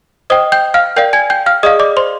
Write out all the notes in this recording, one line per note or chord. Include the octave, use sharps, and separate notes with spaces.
C5 D#5 G5 D#6
G5 G6
F5 F6
A#4 D5 F5 G5 G6
G#5 G#6
G5 G6
F5 F6
G#4 D5 D#5 F5 D#6
D5 D6
C5 C6